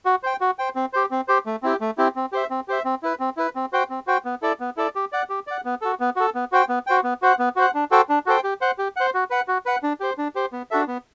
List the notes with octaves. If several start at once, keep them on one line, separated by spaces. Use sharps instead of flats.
F#4
C5 G5
F#4
C5 G5
C4
G4 C5
C4
G4 C5
A3
C4 E4 G4
A3
C4 E4 G4
C4
G4 C5 E5
C4
G4 C5 E5
C4
E4 B4
C4
E4 B4
C4
F#4 C5 G5
C4
F#4 C5 G5
B3
E4 A4 D5
B3
E4 A4 D5
G4
D5 F#5
G4
D5 F#5
B3
F#4 A4
B3
F#4 A4
B3
F#4 C5 G5
B3
F#4 C5 G5
B3
F#4 C5 F#5
B3
F#4 C5 F#5
D4
F#4 A4 C5 G5
D4
F#4 A4 C5 G5
G4
C5 F#5
G4
C5 F#5
F#4
B4 F#5
F#4
B4 F#5
D4
G4 C5
D4
G4 C5
B3
D4 F#4 A4 E5
B3